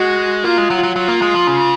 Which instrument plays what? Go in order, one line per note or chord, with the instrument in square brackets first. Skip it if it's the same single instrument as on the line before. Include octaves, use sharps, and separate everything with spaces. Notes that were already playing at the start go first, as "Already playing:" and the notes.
Already playing: [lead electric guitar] G#3 [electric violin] F#4
[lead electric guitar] A#3 [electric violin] F4
[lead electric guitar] G#3
F#3
F#3
[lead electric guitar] F#3 [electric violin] F4
[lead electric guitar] A#3
G#3
F3
C#3